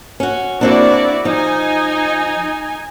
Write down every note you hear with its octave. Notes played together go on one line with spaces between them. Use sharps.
C#4 F#4
A#3 C4 D4 E4 F#4 D5
F3 D#4 G#5